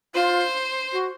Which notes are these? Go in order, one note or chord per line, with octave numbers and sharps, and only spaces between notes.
F4 C5
F#4